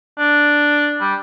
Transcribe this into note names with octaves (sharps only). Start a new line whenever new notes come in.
D4
G3